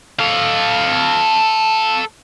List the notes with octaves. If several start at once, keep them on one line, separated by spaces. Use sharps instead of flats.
A4 F5